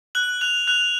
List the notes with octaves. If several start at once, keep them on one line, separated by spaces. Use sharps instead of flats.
F#6 F#7
F#6 F7
F#6 F7